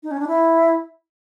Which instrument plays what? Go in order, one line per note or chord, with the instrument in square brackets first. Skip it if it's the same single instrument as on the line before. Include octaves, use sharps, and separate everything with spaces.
[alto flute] D#4
C#4
D4
E4